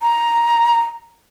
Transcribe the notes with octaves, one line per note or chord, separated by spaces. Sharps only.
A#5